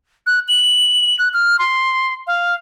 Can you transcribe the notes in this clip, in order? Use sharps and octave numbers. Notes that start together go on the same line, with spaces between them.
F#6
F#7
F#6
F6
C6
F5